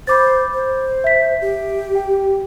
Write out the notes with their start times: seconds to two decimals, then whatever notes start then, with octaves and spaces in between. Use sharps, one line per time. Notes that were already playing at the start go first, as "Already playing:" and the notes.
0.07 C5 B5 D6 A6
0.53 C5
1.04 E5 B6
1.41 G4
1.95 G5